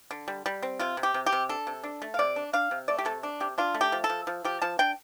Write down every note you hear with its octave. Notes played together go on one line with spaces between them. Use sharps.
D3
G3
G3
C4
C3 F4
C3
G4
C3
G4
C3
D4 A4
C3
D4
A3
F5
C3 D5
D4
D4 F5
C3
A3 D5
G4
C3 A4
D4
C3 G4
D4 F4
A3
G4
F3
A4
F3
F3
F3 G4
F3 A5
D4 G5